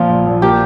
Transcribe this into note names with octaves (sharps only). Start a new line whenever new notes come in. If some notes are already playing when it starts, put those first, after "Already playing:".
Already playing: A#2 F3 F4
A#1
A#1
A#3 G4